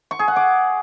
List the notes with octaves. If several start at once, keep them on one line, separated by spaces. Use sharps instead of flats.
C#6
G#4
F#5
D6